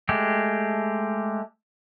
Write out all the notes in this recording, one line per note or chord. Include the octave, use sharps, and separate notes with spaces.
G#3 A3 G4